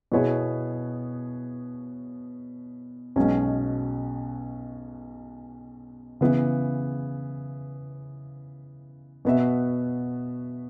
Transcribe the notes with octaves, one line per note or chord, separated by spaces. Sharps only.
B2 B3 E4 G#4 C#5
B1 B2 G#3 C#4
C#3 E3 B3 E4
B2 B3 F#4 E5